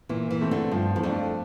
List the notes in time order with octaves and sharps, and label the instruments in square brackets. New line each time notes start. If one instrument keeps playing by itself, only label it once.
[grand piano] A#2 [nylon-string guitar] E3
[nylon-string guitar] E3
[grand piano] A3 C4
[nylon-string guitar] D3
[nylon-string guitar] G2 [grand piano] F3
[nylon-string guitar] E2
[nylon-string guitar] F2 [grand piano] A3 D4